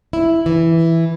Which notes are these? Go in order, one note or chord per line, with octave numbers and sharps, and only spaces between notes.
E4
E3